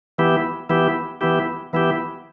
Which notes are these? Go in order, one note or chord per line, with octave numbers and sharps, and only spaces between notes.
E3 B3 E4 G4
E3 B3 E4 G4
E3 B3 E4 G4
E3 B3 E4 G4